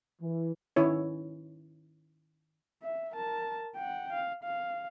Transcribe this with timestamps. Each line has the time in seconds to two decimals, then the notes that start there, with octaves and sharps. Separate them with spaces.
0.22 E3
0.76 D#3 C#4 E4 C#5
2.83 E5
3.13 A#4 A5
3.76 F#5 G5
4.13 F5
4.44 F5